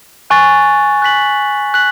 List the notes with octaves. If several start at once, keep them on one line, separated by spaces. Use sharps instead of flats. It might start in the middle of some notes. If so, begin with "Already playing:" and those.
G#5 C#6 F#6 A6
F#6 B6 F#7
F#6 B6 F#7